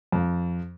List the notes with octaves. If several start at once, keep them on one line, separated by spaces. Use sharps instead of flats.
F2